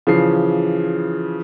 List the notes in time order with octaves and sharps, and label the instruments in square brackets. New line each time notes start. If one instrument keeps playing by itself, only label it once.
[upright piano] C#3 E3 F3 C7